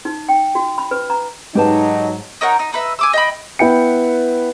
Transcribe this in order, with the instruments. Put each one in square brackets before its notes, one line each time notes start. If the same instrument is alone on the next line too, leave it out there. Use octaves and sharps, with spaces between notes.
[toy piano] D#4
G5
F#4
B5
B4
A#5
[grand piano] G#2 [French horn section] F#3 D#4 [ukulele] G4 B4 A5
[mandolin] D#4 A#4 C#5 F#5
D#4
D#4 B4 E5
G#5 D6 E6
D#5 G5 B5
[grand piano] B3 E4 B4 G5 C#7